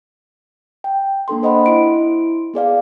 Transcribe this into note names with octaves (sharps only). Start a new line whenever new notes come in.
G5
A#3 D4 A4 C6
C5 D#5 F#5 B5
E4 C6 D7
B3 G#4 D5 F5